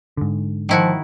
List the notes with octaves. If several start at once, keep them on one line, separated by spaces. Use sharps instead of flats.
G#2 D3
D#3 F3 E4 F#4